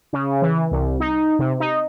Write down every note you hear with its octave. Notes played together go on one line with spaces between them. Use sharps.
C#3
E3
C2
D#4
C3
D#4